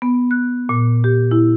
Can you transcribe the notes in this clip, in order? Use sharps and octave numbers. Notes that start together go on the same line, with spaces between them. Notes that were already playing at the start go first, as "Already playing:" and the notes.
B3
F#6
A#2
G4
E4